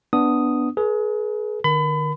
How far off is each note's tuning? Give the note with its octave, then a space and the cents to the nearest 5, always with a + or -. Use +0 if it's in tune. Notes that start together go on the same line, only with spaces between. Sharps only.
B3 +0 D4 +0 D#6 +0
G#4 +30 B4 -40
D3 +40 A#4 +30 B5 +30